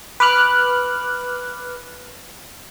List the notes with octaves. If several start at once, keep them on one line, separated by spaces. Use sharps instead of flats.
B4 D6 F6 F#6